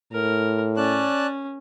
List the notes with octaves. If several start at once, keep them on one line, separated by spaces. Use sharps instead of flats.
A2 A#4
C#4 D5 A5 F#6